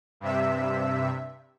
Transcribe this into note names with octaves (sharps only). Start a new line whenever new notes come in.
G2 C3 E5